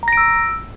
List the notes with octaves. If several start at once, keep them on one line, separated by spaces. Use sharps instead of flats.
A#5 E6 A#6 D7